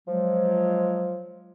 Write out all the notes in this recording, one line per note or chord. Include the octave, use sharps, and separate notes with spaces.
F3 F#3 G#3